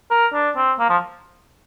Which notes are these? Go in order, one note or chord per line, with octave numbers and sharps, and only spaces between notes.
A#4
D4
C4
A#3
F3